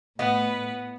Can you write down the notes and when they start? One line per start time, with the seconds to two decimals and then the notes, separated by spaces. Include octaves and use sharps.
0.19 A2 B3 B4 D#5 F#5